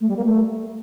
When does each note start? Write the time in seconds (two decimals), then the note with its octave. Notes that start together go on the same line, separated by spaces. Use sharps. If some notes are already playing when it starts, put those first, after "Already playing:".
0.01 A3
0.09 G3
0.17 A#3
0.25 A3